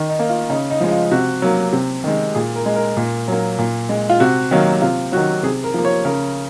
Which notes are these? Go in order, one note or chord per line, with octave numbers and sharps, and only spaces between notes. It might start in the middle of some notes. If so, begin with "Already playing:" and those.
Already playing: D#3
D#4
A#3
F4
C#3 D#4
D#4
F3 G#3
F4
C3 F#4
F#3 A#3
C3
D#3 G#3
A#2 G#4
A#4
G#3
A#4
A#2
F#3 A#3
A#2
G#3
F4
C3 F#4
D#3 F#3 A#3
C3 F4
D#3 F#3 F#4
C3 G#4
A#4
F3 A#3
C#5
C#3 A#4